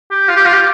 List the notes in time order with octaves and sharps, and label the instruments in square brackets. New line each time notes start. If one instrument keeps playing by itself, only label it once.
[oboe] G4
F4
G4
F4
G4